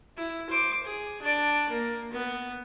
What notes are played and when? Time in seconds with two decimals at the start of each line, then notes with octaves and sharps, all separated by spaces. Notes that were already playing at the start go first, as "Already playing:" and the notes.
0.17 E4
0.50 C5 D6
0.83 G#4
1.22 D4 D5
1.70 A#3
2.12 B3